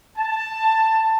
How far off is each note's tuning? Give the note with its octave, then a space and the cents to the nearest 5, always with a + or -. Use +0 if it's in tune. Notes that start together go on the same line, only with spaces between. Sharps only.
A5 +10